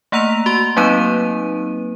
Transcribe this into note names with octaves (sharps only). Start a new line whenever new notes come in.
A3 A#3 F#5 A#5 E6 F7
F#4 C6
F#3 A#3 C4 D#4 B4 D#7